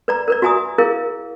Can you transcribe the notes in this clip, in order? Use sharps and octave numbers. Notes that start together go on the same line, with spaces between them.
B4 D5 A#5
A#4 B4 D5
F#4 E5 G#5 A#5 D#6
E4 G#4 A#4 F5